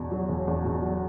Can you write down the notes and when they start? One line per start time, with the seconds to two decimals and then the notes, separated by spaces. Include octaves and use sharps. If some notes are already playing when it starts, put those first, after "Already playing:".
Already playing: E2 B2
0.12 F#3
0.29 E1
0.47 E2
0.64 B2
0.82 F#3